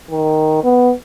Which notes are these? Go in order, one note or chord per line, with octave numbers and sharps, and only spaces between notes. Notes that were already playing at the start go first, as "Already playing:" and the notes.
D#3
B3